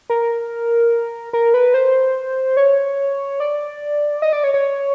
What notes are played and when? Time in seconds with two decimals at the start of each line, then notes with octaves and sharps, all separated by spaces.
0.10 A#4
1.33 A#4
1.54 B4
1.74 C5
2.57 C#5
3.40 D5
4.22 D#5
4.33 D5
4.44 C#5
4.54 C#5